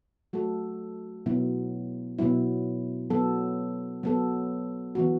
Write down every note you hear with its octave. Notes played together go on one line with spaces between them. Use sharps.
F#3 A3 F#4 A4
B2 F#3 B3 E4
B2 F#3 B3 E4
F#3 B3 A4
F#3 B3 A4
E3 B3 F#4